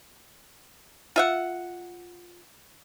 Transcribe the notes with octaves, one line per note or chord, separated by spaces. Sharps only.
F4 E5 F#5